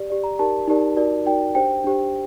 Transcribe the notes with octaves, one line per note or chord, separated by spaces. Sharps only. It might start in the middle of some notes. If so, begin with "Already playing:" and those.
Already playing: G4 D5
G4 D5
A#5
D#4 G4 A#4 D5 A5
D#4 G4 A#4 D5
D#4 F#4 A#4 D5
D#4 F#4 A#4 D5 G5
D4 G4 C5 G5
D4 G4 C5